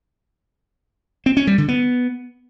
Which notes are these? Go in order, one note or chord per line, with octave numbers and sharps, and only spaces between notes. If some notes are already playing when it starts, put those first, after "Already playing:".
C4
C#4
G3
D3
B3